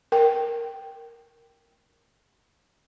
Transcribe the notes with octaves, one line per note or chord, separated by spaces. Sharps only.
A#4 G5